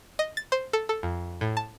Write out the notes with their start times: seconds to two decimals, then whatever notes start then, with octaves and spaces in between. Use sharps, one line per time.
0.19 D#5
0.37 A6
0.52 C5
0.73 A4
0.89 A4
1.03 F2
1.41 A2
1.57 A5